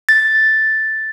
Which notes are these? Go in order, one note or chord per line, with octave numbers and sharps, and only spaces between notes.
A6